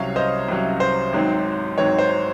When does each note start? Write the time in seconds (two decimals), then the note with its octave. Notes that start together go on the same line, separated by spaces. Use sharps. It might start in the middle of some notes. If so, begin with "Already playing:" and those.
Already playing: C2 C3 F#3 C#4 C#5 F5
0.16 C5 D#5
0.49 C2 C3 F#3 C#4
0.80 C5
1.13 G#1 G#2 F#3 C4
1.78 G#1 G#2 F#3 C4 C#5
1.99 C5